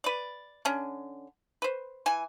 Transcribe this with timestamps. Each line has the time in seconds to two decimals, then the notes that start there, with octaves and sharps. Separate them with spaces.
0.04 B4 D5
0.65 D3 C#4
1.62 B4 C5
2.06 E3 G#5